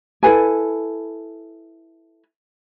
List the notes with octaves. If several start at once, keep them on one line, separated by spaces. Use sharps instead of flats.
E4 A4 B4 G#5